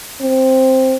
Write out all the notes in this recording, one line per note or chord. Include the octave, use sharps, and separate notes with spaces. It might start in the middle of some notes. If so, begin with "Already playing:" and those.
C4